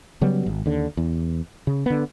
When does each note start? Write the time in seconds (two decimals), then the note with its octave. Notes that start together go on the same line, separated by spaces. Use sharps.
0.21 C#3 F#3 G3 B3
0.46 G#1
0.66 D#2 D3
0.97 E2
1.67 C#3
1.86 D3 B3